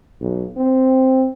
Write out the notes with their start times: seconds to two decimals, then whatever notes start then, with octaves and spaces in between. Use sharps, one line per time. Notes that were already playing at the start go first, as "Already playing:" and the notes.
0.21 B1
0.57 C4